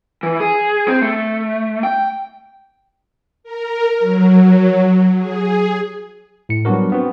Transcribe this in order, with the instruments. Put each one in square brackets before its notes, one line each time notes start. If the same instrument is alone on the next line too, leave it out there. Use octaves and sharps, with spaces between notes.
[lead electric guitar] E3
G#4
C4
A3
G5
[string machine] A#4
F#3
G#4
[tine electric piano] A2 C#7
F#3 G3 B3 D4 F#4 A#4
B3 C4 F#4